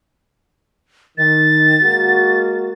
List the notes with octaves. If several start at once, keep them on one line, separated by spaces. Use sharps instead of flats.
D#3 A6
G#3 A#3 F#4